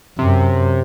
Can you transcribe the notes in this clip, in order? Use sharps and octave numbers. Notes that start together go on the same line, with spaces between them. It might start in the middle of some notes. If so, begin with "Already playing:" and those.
F#2 C3